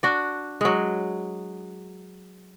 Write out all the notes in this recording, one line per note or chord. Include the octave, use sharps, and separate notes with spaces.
D4 F#4 D5
F#3 G#3